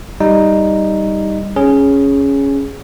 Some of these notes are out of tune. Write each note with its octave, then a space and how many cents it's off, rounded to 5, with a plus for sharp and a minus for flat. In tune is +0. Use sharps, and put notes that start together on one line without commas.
G3 +0 D#4 +0
C#4 +0 G#4 +0